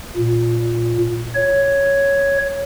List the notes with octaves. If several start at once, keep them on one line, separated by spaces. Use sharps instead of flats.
A#2
C#5